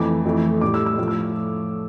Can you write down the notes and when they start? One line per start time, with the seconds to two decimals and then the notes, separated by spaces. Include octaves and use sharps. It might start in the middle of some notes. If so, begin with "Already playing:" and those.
Already playing: F2 E3 A3 D6
0.25 F2 E3 A3
0.61 A2 G3 D6
0.74 E6
0.86 E6
0.98 A2 F3 A3
1.08 E6